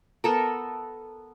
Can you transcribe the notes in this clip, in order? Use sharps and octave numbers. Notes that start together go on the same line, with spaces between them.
B3 A4 A#4